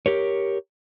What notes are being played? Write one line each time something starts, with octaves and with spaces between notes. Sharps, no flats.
G4 A#4 C#5